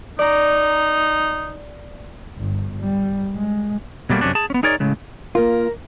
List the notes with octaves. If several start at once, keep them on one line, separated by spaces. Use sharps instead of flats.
D#4 D5 A#5
G1 G2
G3
G#3
B2 F#3 G3 A3 A#3
F#2 C3 C#4 D4
G#4 A5
B3 C#4
D#4 G#4 A#4 C#5 D5
A2 C#3 G#3
A#3 F4 A#4